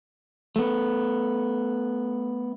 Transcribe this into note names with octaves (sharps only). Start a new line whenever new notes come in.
A3 B3